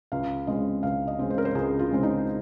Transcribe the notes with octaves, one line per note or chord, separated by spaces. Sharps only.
C#2 F5
C#3 G#3 C4 D#5
C#2 F5
D#5
C#3 G#3 C4
C5
A#4
C5
C#2 G#4
F4
C#3 G#3 C4
D#4